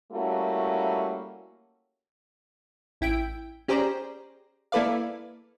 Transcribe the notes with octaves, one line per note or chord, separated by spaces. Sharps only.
G3 A3 A#3 C#4 E4 F#4
A1 E4 G5 D7
C#4 G4 G#4 C5 D5 A#5
A#3 E4 A4 B4 D5 F5